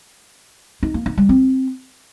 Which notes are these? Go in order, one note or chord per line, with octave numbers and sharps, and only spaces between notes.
D#4
A#3
D#4
G3
C4